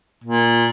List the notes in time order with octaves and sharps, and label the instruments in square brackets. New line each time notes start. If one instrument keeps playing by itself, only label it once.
[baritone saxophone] A#2